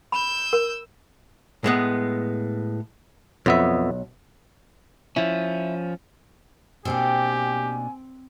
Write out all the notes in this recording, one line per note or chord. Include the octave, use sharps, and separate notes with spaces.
B5 E6 G6
A#4
A2 G#3 B3
B1 F2 B3 E5
F3 C#4 E4
B2 A#3 C4 D4 G4 G#5